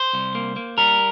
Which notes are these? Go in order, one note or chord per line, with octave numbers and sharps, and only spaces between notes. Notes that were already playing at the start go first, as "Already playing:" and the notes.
Already playing: C5
C2
A#3
A#3
G3 A#4